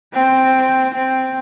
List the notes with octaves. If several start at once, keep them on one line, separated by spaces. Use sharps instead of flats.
C4
C4